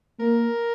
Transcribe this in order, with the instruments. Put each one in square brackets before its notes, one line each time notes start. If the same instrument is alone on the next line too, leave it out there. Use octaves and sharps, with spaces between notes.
[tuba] A#3 [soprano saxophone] A#4